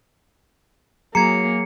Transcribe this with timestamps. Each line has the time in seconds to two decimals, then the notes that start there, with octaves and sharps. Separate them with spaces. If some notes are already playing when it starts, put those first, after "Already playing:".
1.15 F#3 A#3 G#4 A#5 G#6 C7 C#7